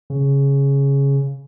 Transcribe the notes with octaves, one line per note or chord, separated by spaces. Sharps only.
C#3